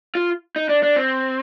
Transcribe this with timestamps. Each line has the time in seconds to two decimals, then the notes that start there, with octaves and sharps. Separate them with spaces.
0.15 F4
0.56 D#4
0.69 D4
0.83 D4
0.96 C4